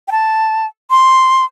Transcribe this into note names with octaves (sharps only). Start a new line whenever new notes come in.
G5
A5
C6